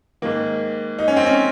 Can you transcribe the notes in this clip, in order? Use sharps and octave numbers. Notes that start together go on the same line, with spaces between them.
G#2 D#3 A#3
D#4
C#4
C4
C#4